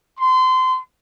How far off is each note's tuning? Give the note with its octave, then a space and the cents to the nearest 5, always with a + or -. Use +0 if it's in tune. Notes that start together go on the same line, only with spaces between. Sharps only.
C6 -25